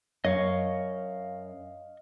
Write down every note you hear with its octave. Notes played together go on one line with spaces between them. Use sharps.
F#2 C#5 D#5 F5 C#6